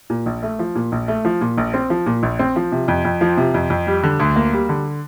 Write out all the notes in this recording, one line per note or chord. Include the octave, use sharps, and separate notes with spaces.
A#2
A#1
A3
F3
A#2
A#1
A3
F3
A#2
A#1
C4
F3
A#2
A#1
C4
F3
C3
F2
F2
F3
C3
F2
F2
G3
D3
D2
A#3
G3
D3